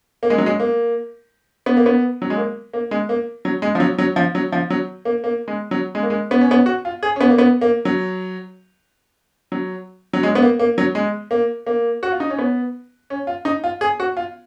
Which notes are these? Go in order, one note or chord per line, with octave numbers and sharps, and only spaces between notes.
A#3
G#3
F#3
G#3
A#3
B3
A#3
B3
F#3
G#3
A#3
A#3
G#3
A#3
F#3
G#3
F3
F#3
F#3
F3
F#3
F3
F#3
A#3
A#3
G#3
F#3
G#3
A#3
G#3
B3
C#4
B3
F#4
F4
G#4
C#4
B3
A#3
B3
A#3
F#3
F#3
F#3
G#3
B3
A#3
A#3
F#3
G#3
A#3
A#3
F#4
F4
D#4
C#4
B3
C#4
F4
D#4
F4
G#4
F#4
F4